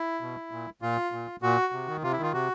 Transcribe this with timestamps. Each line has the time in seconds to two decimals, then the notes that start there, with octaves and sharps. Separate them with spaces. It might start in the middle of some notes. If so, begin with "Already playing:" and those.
Already playing: E4
0.21 B2
0.51 A#2
0.82 A#2 F4
1.12 A#2
1.42 A#2 F#4
1.73 C3
1.88 D#3
2.03 C3 F4
2.13 E4
2.18 D#3
2.23 F4
2.33 C3 F#4